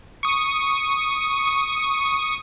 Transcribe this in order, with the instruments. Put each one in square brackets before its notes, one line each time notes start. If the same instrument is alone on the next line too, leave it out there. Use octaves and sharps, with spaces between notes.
[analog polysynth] C#6 D#6